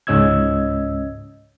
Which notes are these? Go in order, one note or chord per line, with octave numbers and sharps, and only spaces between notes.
C#2 G#2 C#4 D#5 E6 G#6